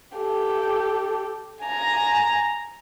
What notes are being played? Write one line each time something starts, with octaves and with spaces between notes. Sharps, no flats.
G4 A4
G#5 A#5